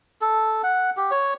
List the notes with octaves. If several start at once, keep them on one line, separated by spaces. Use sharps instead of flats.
A4
F#5
G4
C#5